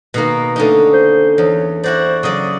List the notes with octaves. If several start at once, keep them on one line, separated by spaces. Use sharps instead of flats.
B2 D#3 A#3
D3 A3 C#4 D#4
C5
E2 C#5
E4 F#4 C5 D5
C#3 F#3 D5 D#6